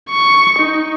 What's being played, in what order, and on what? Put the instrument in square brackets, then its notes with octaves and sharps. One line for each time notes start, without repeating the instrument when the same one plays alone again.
[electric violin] C#6
D#4